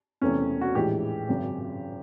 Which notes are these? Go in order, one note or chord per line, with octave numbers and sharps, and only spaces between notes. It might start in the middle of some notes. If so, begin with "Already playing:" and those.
E1 E2 C3 E3 A3 C#4
F#4
A#1 A2 E3 G#3 G4
G#1 F#2 C#3